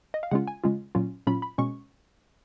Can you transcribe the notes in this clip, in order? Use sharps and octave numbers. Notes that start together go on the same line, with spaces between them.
D#5
F5
C#3 G#3 C#4 F4 F#5
G#5
C#3 G#3 C#4 F4
A#2 F#3 C#4 F4
A#2 F#3 C#4 F4 B5
B5
B2 G#3 C#4 C#6